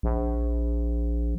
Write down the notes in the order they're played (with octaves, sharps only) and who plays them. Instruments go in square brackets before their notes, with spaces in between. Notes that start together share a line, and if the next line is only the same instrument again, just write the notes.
[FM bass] A#1